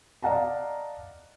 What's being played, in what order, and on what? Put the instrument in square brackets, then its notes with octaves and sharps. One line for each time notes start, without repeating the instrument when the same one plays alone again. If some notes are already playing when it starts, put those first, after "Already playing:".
[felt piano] D5 D#5 F5 F#5 A5 A#5